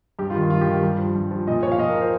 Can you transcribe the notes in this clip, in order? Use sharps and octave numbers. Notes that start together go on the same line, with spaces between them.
G2 G4
F4
D#3
G2 F4
G4
D#3
G2
F3
G2
F3
A#2 D#5
F3 C#5
F5
A#2 D#5
A#4
F3
C5